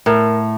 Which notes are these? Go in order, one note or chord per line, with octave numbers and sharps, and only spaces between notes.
A2 A#4